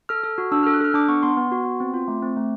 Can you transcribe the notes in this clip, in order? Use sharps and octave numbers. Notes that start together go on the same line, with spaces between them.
A4 F6
A4
F#4
D4 E6
A4 F6
F#6
A4 F6
D4 D6
B3 C#6
B3 C6
B3
F#4
B3
C4
F4
A3
C4
A3